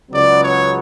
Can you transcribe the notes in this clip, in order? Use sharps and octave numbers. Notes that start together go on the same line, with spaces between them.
C#2 C#3 F#3 B3 D5
C#5